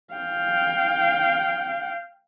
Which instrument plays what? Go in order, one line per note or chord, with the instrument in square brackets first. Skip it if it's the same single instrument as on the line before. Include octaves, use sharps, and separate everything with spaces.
[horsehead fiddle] F5 G5